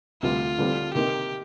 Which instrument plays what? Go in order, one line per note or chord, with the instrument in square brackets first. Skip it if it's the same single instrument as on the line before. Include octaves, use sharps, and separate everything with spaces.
[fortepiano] D2 C3 G3 [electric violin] F4
[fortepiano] D3 G3 C4
[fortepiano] C3 D#3 A#3 D#4 [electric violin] G4